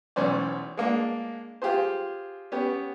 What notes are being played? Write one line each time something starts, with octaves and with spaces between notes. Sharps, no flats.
B1 E2 C#4 C5 D5
G#3 A#3 D4
F4 G4 G#4 C5
B3 C#4 G4